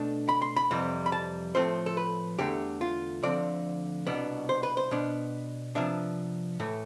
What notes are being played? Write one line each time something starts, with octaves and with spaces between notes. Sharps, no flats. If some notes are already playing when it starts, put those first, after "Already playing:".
Already playing: B2 A3 D4
B5
C6
B5
F2 C3 E3 G3
B5
A5
A2 F3 A3 C4 C5
A4
B4
E2 D3 A3 G4
F4
D2 D3 F3 C4 D5
C2 B2 B3 D4
C5
B4
C5
B2 B3 D4
C3 F3 B3 D4 E5
A2 E3 A3